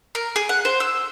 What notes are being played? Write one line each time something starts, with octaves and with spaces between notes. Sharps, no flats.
A#4
G#4
F#5
C5
E6